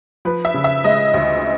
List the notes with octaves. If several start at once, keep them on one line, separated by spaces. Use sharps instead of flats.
F3 B4
E5
C#3
E5
G#3 D#5
D2